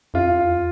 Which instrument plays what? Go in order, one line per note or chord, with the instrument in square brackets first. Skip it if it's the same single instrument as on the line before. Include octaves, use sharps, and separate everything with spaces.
[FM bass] F2 [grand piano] F4
[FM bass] E2